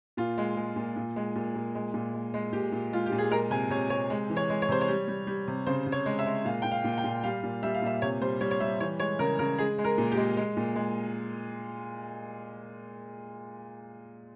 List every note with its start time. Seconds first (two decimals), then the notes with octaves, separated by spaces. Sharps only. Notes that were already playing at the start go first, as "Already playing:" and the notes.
0.17 A#2 F4
0.38 G#3
0.57 G#3
0.76 A#2
0.96 A#2
1.16 G#3
1.35 A#2
1.55 A#2
1.75 G#3
1.94 A#2
2.14 G#3
2.34 G#3
2.53 A#2 G4
2.72 A#2
2.93 G#3 F4
3.06 G4
3.12 A#2
3.18 G#4
3.31 G#3 A#4
3.50 C3 G#5
3.70 C3 C#5
3.90 C3 C#5
4.10 G#3
4.30 E3
4.37 C#5
4.50 G#3
4.62 C#5
4.68 C3 C5
4.81 C#5
4.88 G3
5.08 G3
5.27 G3
5.47 C3
5.66 C#3 C5
5.86 C#3
5.92 C#5
6.06 G#3
6.19 E5
6.26 G#3
6.45 A#2 F5
6.62 A#2 G5
6.71 F5
6.84 A#2
6.98 G5
7.04 A#2
7.24 G3 F5
7.43 A#2
7.63 G3 E5
7.74 F5
7.82 A#2 E5
8.02 C3 C#5
8.21 G3 C5
8.41 G3 C#5
8.51 C#5
8.60 G3 E5
8.80 E3 C#5
9.00 G#3 C#5
9.19 C#3 A#4
9.39 C#3 A#4
9.58 G#3 G#4
9.78 G#3
9.84 A#4
9.98 A#2
10.12 G4
10.17 G#3
10.37 G#3
10.57 A#2
10.76 G#3